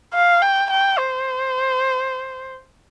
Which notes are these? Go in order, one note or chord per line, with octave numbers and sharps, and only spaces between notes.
F5
G5
G5
C5